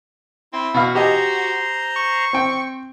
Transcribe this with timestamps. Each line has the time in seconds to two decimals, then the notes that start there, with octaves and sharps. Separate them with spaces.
0.53 C4 E4
0.74 B2 F#4 F5
0.95 G4 C5 D#5 G#5 A#5 C6
1.96 C#6
2.33 C4 G5